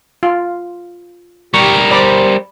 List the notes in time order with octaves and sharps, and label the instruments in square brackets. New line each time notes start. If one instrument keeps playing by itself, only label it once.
[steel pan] F4
[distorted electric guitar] G3 A#4 [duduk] G4 [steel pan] C#6
[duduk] C5 [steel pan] D5 B5 D6